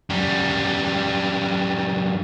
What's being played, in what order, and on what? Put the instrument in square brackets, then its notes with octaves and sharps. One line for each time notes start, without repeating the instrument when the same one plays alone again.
[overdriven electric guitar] F#2 G3